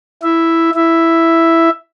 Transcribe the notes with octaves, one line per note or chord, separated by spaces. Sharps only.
E4 E5
E4 E5